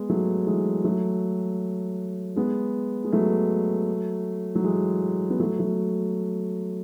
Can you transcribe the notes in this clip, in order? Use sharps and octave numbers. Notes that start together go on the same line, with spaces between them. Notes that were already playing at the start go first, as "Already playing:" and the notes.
Already playing: G#3 B3
F#3 A3
E3 G#3
F#3 A3
G#3 B3
G#3
F#3 A3
F#3
E3 G#3
B3
F#3 A3
F#3 A3